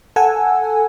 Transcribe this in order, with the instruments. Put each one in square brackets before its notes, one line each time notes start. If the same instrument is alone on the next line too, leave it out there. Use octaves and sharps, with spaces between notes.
[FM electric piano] A4 F#5 G#5 E6